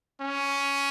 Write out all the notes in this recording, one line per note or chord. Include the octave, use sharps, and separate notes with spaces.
C#4